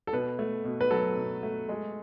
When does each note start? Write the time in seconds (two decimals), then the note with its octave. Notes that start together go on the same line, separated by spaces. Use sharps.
0.07 A4
0.13 B2 B4
0.39 A3
0.64 B2
0.81 B4
0.91 F#3 A4
1.16 B2
1.43 A3
1.69 G#3